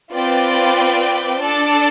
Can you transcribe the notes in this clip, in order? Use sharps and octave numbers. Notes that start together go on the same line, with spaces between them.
C4 F4 B4 D5 G5
D4 A4 D5 A5